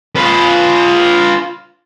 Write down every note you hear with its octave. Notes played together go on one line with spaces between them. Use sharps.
F4 B4